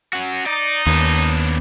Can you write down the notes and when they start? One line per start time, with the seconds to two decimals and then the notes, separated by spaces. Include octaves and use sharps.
0.13 C#4 F#4
0.46 D#4 D5
0.87 D#2 B3 C#4 D4